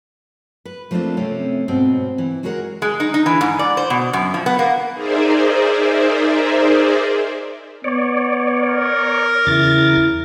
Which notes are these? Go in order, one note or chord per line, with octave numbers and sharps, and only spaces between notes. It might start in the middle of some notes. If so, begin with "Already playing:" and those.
B4
F3 A3 A#3 C4 D4 F4
C3 A3 C4 C#4
G#2 B2 C4
E3
G#3 F#4 G#4 A#4 C#5 F#5
G#3
D#4
D#4
E3
G#2
D5
C5
B2
F#2
F3
B3
A#3
D#4 G#4 A#4 C5 D5 E5
B3 C#5 D5
A#4
E2 C#3 E4 A6